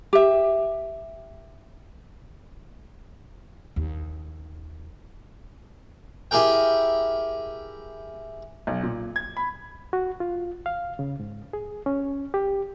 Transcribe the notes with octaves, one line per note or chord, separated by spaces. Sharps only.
G4 E5
D#2
E4 G4 G#4 A#4 G5
B1
A#2
G#6
B5
F#4
F4
F5
C#3
G#2
G#4
C#4
G4